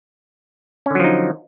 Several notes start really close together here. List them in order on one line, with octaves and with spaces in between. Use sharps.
C#4 D3 F#3 F3 D#4